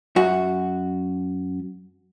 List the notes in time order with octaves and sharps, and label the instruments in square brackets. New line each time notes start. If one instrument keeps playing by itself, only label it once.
[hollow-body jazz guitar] F#2 F#4